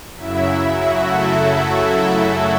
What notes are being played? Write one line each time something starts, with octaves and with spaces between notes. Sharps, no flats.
F#2 C#3 F#3 E4 E5
F#3 F#4
A3 A4